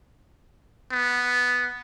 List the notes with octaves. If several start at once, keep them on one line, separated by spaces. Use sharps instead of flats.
B3